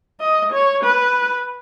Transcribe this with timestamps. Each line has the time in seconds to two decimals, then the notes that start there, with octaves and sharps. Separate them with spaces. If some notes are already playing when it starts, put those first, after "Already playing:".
0.20 D#5
0.53 C#5
0.84 B4